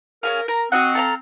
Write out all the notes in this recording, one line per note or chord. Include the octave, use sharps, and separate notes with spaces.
C#4 G#4 A#4 F5
A#4 A#5
C4 F#4 D#5 F#5
A4 F5 A#5